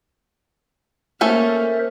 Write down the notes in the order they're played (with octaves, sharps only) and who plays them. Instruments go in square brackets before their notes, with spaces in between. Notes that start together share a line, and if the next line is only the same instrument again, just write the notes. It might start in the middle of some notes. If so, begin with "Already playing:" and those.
[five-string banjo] A3 C#4 A4 [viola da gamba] A#3 [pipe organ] A#4 C5 E5